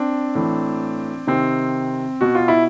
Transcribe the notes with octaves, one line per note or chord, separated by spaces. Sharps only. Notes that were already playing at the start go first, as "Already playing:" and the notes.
Already playing: C4 D4
A2 E3
C3 D#3 C4
B2 F#4
F4
E4